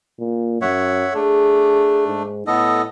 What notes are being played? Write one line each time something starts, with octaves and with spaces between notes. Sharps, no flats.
A#2
F#2 C#5 E5 F#5
A3 D4 G#4
G#2
A2 B3 A4 D#5